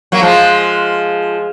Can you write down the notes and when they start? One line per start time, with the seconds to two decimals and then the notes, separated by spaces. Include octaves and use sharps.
0.12 F#3 A#3
0.22 F3 G#3